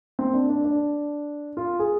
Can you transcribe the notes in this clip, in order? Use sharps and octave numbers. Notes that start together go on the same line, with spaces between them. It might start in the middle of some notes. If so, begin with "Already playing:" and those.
C4
D4
D4
D4
F4
G#4